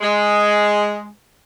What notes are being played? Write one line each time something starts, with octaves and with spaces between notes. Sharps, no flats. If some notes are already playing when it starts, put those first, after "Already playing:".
G#3